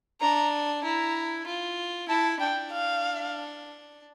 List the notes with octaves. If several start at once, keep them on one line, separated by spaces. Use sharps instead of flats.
D4 A#5
E4 A#5
F4
E4 A5
D4 G5
F5